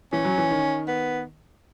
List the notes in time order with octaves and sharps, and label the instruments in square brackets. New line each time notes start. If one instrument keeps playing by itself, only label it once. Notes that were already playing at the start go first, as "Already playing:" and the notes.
[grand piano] E3 [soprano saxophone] C#4
[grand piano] F#3
E3
D#3
[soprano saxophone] B3